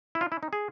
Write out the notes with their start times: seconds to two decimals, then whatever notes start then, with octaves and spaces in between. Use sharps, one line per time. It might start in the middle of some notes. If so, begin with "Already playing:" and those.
0.15 E4
0.21 F4
0.32 E4
0.43 D#4
0.53 G#4